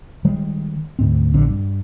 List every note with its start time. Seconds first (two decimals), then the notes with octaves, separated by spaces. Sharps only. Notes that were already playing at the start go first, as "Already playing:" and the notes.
0.25 D#3 G3 G#3
0.99 D2 G#2 C4
1.34 A#1 D3 C4
1.49 G2